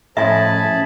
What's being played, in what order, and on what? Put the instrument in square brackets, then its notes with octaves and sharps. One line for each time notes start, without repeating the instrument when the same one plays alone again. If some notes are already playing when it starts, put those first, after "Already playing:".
[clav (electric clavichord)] A2 [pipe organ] F3 C#4 [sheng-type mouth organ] G#4 A5 B5 [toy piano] E5 G#5